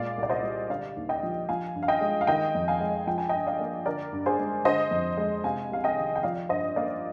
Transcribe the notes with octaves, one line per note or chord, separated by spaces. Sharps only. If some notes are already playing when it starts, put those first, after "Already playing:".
Already playing: A#2 G#3 D5 F5
C2
D5
C5 D#5
G3
D3 D5 F5
D#2
D#5 G5
F3
F3 F5 G#5
G2
F5
D#5 G5
G#3
F5
D#3 D#5 G5
F2
F5 G#5
G#3
F3 G5
G#5
D#5 G5
G2
D5 F5
A#3
D3 A#4 D5
G2
G#4 C5
G#3
D3 C5 D#5
F2
G#3
C3 F5 G#5
C2 F5
D#5 G5
D#3
G5
F3 D5 F5
G2 C5 D#5
A#3 D5 F5